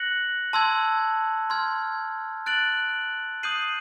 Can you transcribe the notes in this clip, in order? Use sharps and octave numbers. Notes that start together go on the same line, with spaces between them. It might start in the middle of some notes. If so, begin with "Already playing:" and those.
Already playing: F#6 A#6 C#7 F#7
A5 C6 E6 G#6
C6 F6 G#6
F#6 A6 D7 F#7
D#6 G6 C7 D#7 F#7